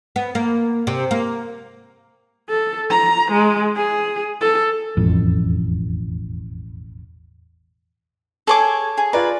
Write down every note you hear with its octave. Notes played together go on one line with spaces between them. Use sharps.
B3
A#3
C3
A#3
A4
A#5
G#3
G#4
A4
E1 A1 F2
G#4 A4 C#5 D6
G#4
F4 B4 D5 A#5